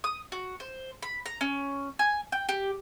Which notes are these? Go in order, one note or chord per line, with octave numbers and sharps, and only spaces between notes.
D#6
F#4
C5
B5
A#5
C#4
G#5
G5
G4